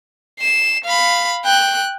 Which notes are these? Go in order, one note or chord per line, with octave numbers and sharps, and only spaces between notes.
C7 E7
F5 B5
G5 F#6